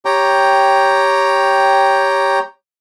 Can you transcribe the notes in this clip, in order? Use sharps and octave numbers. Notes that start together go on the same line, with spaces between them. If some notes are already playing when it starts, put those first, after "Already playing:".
G4 C#5 G5 A#5